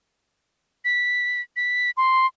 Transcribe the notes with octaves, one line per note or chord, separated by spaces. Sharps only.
B6
B6
C6